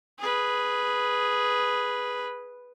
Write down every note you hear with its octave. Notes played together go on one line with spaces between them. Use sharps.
G#4 B4